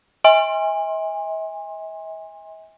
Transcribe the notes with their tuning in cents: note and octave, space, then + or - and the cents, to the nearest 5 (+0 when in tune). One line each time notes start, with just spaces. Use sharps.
E5 -45 G#5 -30 C6 +25